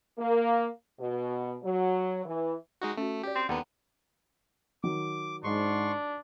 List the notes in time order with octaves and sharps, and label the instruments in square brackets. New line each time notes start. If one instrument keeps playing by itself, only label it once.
[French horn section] A#3
B2
F#3
E3
[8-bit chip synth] G#3 D#4 F#4
[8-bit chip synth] A3 [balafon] C#4 F#4
[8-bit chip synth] G4 [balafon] C#5 D5
[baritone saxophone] C4
[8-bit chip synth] D#2 B3 [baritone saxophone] D3 [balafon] F#5 G5 A#5
[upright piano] D#3 F#3 [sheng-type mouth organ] D6
[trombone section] G#2 [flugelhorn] D4 [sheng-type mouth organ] C6 C#6